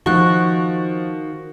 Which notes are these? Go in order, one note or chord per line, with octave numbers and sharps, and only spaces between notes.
D#3 F3 F#4 C#6 F#6